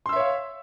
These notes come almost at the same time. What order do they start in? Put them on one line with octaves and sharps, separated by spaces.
C6 E6 E5 C#5 F5